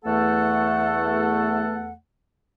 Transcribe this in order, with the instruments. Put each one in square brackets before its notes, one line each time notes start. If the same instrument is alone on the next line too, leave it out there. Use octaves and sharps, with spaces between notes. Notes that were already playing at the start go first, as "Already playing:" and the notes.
[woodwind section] E2 A3 A4 F#5